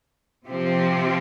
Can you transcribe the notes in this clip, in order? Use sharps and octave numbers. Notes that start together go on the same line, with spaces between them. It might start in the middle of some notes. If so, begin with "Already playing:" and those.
C3 F3 C4 G4